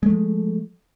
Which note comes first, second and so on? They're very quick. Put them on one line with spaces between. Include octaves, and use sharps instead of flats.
G#3 A3 F3